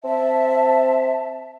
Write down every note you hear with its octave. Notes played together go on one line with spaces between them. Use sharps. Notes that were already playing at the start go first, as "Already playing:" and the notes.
C4 E5 A5